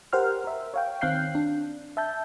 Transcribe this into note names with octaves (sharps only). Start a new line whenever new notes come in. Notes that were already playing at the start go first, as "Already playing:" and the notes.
G4 A#4 C5 F#5 C6 F6
A#4 E5
C#5 F5 G5
D#3 C4 F5 F#6 G6 C7
D4
E5 A5 G6